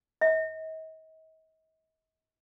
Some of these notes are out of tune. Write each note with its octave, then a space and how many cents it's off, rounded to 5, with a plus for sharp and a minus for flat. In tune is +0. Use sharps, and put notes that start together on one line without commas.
D#5 +40